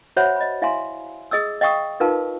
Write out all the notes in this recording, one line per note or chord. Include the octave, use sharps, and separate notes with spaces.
F#4 C5 C#5 E5 F#5 B5
D#5 B5
E4 E5 F5 G#5 A#5 C6
G#4 D#5 D#6 E6
D#5 F5 G5 C#6 D#6
D#4 F4 A#4 B4 F5 A5